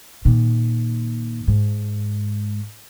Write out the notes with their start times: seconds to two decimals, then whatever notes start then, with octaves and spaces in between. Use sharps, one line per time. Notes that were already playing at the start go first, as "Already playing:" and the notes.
0.25 A#2 D#3
1.48 G#2